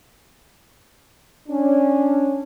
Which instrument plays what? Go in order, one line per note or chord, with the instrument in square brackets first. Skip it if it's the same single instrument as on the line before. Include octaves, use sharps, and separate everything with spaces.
[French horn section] C#4 D4